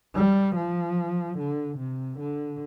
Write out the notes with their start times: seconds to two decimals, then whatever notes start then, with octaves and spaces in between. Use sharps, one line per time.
0.15 G3
0.56 F3
1.38 D3
1.78 C3
2.20 D3